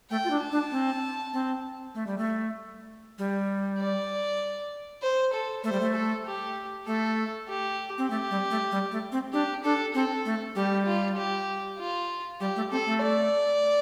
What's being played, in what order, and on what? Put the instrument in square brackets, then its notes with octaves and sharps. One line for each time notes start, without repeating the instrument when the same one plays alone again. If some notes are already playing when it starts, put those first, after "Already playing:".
[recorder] A3 [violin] G5
[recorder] F4
D4
[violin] A5
[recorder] D4
C4
C4
A3
G3
A3
G3
[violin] D5
C5
A4
[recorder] A3 [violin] C5
[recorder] G3
A3
[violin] A4
G4
[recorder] A3 [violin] A4
[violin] G4
[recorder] C4
[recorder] A3 [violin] G4
[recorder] G3
A3
G3
A3
C4
[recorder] D4 [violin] G4
[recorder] D4 [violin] A4
[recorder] C4 [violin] A4
[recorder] A3
[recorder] G3 [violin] G4
[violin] F4
G4
F4
[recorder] G3 [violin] G4
[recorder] A3
[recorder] C4 [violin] A4
[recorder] A3
[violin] D5